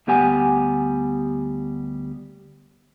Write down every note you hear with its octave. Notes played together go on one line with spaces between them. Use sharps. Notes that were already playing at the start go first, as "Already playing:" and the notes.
D2 G3 B3 G4 F#5 G#5